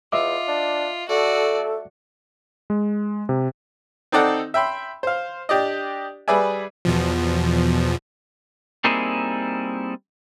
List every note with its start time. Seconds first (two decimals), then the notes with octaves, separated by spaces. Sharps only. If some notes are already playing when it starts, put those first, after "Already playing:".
0.12 E2 F4 D#5 E5 D6
0.47 D4
1.09 A3 F#4 A4 D5
2.70 G#3
3.29 C3
4.12 C4 D#4 A4 D5 F#5
4.54 E5 G5 B5 C6
5.03 C5 F5
5.49 D4 G4 D5 D#5
6.28 G3 G#4 B4 D5 E5 G#5
6.85 E2 B2 F3
8.84 G3 A#3 C4 D#4 E4 G#4